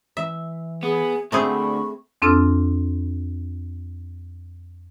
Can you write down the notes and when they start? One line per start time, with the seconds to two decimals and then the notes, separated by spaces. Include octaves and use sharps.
0.17 E3 E5
0.83 B3 G#4
1.32 D2 A3 C4 G#4 B5 C#6
2.22 F2 C4 D4 A4 E6 F6